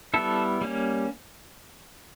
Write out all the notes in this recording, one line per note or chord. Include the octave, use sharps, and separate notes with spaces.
G3 B3 E4 A4
G3 A#3 C#4